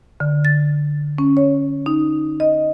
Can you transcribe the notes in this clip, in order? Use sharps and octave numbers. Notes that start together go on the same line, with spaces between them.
D3
A6
C#4
C#5
D#4
D#5